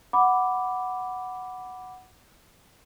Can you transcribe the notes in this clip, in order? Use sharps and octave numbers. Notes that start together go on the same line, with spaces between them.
F#5 B5 D6